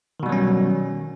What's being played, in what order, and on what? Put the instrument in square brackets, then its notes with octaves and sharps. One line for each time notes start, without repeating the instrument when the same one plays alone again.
[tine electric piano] D#3
B2
G3
F#3
C#4